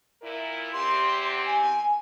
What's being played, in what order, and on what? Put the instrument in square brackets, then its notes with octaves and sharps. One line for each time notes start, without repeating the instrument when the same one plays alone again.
[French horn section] A#2 E4 A#4
[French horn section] E2 C4 G4 [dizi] C6
[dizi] G#5